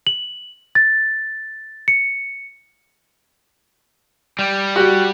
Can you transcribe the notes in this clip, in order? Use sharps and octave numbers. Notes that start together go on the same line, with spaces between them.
F#7
A6
C#7
G3
F#4 G4 F#5